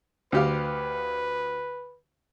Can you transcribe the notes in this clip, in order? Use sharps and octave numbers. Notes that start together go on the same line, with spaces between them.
D2 G4 B4 F5